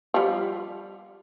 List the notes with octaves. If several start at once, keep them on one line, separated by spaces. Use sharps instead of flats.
F3 G3